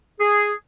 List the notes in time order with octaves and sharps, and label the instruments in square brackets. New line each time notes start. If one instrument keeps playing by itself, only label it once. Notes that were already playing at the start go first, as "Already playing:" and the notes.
[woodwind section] G#4